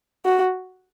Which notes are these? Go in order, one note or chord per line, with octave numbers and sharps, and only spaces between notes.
F#4